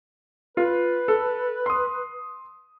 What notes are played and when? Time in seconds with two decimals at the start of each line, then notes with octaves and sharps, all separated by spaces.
0.57 F4 B4
1.08 A4
1.66 C6 D#6